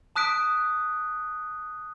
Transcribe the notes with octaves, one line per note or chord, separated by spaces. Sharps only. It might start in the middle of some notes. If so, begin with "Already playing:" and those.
A5 D#6 F#6 B6 D7